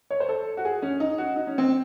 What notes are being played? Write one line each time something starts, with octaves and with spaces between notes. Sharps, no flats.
C#5
C5
A4
F#4
G#4
C#4
D#4
F#4
D#4
C#4
C4